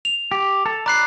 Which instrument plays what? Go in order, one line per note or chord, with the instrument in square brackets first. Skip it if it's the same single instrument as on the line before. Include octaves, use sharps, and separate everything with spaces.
[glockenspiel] F7
[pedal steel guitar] G4
A4
[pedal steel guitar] D5 B5 [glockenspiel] A#5 F#6 C7